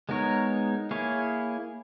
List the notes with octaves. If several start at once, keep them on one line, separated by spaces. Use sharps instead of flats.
G#3 B3 D#4 A#4 C#5
A#3 E4 G#4 C#5